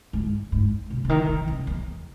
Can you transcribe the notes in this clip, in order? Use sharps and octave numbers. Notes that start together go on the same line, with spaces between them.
G#2
G#2
B2
C#3
D#3
E3
C#3
E2